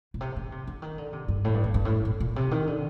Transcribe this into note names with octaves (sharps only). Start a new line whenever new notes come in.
A#2
C3
D#3
C3
D3
D#3
D3
C3
G2
A2
G2
F2
G2
A2
A#2
A#2
C3
D#3
D3